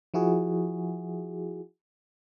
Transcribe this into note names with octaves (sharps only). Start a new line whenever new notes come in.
F3 E4 F#4 G#4